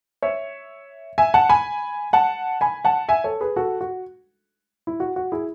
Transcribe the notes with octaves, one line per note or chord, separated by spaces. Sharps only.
C#5 E5
E5 G#5
F#5 A5
G#5 B5
F#5 A5
G#5 B5
F#5 A5
E5 G#5
A4 C#5
G#4 B4
F#4 A4
F#4
E4
F#4
F#4
E4 G#4